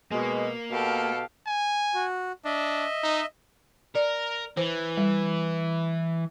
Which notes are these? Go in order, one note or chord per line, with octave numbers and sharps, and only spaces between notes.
B2 G#3 A#3
B2 G4 A4 F5
G#5
F#4
D4 D#5 E5
D#4
A#4 D5
E3 C5
G3